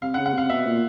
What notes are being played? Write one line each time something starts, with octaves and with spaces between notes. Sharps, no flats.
C3 F5
F#5
C#3
F#5
C3 F5
B2 E5
A#2